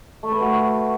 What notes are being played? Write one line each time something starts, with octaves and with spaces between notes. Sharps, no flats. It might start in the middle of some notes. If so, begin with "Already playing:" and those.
A3
B4
F#4